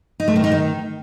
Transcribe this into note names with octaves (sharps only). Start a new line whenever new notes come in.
D#4
A3
D#3
D#4
D#3